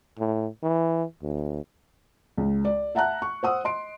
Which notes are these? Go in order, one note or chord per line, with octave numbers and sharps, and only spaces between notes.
A2
E3
D2
C#2
D5
E5 F#5 A5 A#5 F#6
C#6
C5 F#5 D#6 E6
D#5 C6 D7